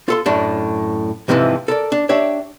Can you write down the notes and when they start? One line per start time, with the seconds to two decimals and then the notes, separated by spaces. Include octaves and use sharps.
0.08 F4 A4 C6
0.26 F#2 A2 D4
1.28 F2 G#2 C3 E3 F3
1.68 A4 A#4 D5
1.92 D4
2.09 D4 G4 C#5 E5